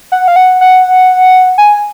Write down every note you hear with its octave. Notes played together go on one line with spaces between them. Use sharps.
F#5
F5
F#5
F#5
G#5